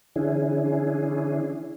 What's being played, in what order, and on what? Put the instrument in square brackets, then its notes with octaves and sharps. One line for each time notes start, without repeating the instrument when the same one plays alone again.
[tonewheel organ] D3 E3 C#4 D4 E4 G#4